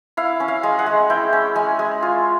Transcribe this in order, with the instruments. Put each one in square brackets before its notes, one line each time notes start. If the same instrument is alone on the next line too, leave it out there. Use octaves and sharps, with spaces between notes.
[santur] E4 F5
C#4
F5
G#3
F#5
G#3
E4 G5
C#4
G#3 G#5
G#3
F4